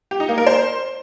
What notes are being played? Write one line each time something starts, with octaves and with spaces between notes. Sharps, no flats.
G4
D#4
A#3
A#4
C5